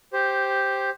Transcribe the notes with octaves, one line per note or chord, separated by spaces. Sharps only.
G4 C5